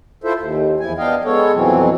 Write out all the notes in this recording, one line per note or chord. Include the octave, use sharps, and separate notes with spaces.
E4 F4 A4 C5 E5
D#2
E2 F3 E4 G#5
B3 D4 D#5 F5 G5
G#3 B3 A4 C#5
F2 B2 E3 F#3 C4